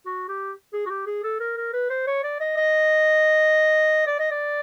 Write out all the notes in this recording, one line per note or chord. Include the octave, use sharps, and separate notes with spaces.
F#4
G4
G#4
F#4
G4
G#4
A4
A#4
A#4
B4
C5
C#5
D5
D#5
D#5
D5
D#5
D5